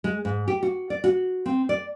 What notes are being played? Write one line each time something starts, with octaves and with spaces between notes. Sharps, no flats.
G#3
G#2
G4
F#4
D5
F#4
C4
D5